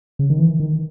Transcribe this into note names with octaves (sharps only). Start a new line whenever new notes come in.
C#3
D#3
E3
D#3